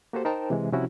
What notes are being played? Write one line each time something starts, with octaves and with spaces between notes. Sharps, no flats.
A#3 F#4 G4 A4 C5
D#4 A#4 C5 G5 A5 A#5
C3 E3 G#3
C2 C3 F3 C#4 E4 F#4